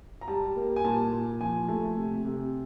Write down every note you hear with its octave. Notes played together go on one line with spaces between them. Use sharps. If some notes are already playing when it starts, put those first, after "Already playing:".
A#5
G3 A5
A#3
G#5
A#2 A5
A#2
F3 G#5
A3
C3
C3